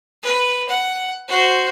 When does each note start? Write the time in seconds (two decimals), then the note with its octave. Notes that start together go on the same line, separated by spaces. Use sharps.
0.23 B4
0.69 F#5
1.28 F#4 C5